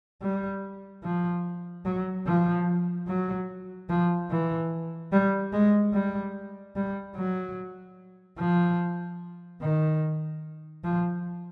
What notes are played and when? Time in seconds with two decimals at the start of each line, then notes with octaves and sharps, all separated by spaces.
0.22 G3
1.03 F3
1.85 F#3
2.26 F3
3.07 F#3
3.89 F3
4.31 E3
5.12 G3
5.53 G#3
5.94 G3
6.76 G3
7.16 F#3
8.38 F3
9.61 D#3
10.84 F3